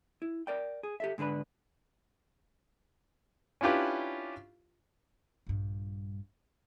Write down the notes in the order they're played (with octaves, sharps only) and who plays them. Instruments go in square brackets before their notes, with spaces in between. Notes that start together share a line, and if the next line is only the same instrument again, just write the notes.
[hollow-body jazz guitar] E4
A#4 D5 G5
G#4
G4 A4 E5
G#2 D3 D4 B4 B5
[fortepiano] C#4 D4 E4 F4 G4 B4
[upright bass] A#1 G2